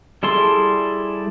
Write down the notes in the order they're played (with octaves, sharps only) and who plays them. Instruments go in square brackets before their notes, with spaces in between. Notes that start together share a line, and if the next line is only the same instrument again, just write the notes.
[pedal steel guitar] G3 E4 G#4 A4 C6